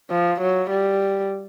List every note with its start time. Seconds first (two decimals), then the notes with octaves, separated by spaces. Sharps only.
0.10 F3
0.41 F#3
0.70 G3